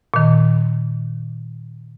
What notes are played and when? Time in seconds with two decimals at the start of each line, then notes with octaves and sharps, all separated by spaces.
0.14 A#2 D#3